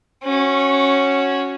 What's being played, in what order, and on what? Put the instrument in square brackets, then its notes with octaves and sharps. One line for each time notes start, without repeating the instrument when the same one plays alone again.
[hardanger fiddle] C#4 F#4